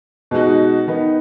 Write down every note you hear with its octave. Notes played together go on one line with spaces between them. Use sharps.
B2 G#3 D#4 F#4
D#3 B3 D#4